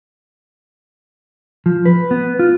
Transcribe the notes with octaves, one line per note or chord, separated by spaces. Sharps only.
F3
B4
B3
F4